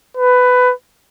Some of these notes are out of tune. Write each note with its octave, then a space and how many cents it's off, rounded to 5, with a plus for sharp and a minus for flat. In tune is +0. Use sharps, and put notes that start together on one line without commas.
B4 +15